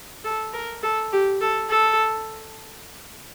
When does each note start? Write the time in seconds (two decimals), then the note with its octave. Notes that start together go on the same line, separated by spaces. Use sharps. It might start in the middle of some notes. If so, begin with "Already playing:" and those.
0.25 A4
0.53 A#4
0.83 A4
1.12 G4
1.41 A4
1.70 A4